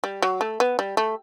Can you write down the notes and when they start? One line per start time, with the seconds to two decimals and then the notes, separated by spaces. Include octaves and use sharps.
0.04 G3
0.22 F#3
0.41 A3
0.60 B3
0.79 G3
0.97 A3